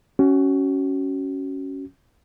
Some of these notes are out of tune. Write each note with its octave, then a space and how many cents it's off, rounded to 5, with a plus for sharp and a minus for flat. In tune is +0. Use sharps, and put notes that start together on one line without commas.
C#4 +0 F#4 +25